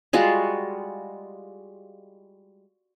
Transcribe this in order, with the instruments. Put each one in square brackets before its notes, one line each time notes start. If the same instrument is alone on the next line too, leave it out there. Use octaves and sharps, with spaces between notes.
[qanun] G3 G#3 F4 F#4